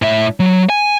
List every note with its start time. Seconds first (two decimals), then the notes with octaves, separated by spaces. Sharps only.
0.02 A2 E5
0.40 F#3
0.70 G#5